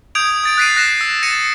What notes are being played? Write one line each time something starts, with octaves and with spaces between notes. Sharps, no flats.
D#6 G6 G#6 D7 F7
D#6 A6 D7
F#6 A6 B6 C7 D7 D#7
F#6 A#6 C7 E7
E6
A6 A#6 C#7 D#7 E7